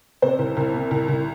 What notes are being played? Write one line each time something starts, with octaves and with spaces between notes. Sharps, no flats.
C3 C5
C2
C2
C3
C2
C2